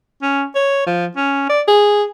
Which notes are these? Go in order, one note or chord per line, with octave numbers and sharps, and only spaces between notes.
C#4
C#5
F3
C#4
D5
G#4